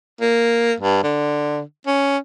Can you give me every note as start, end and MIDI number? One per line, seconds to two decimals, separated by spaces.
0.21 0.74 58
0.81 0.99 43
1.03 1.61 50
1.86 2.18 61